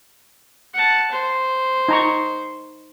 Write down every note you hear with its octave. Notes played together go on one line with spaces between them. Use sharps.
F#5 A5
C5
D#4 A#5 C#6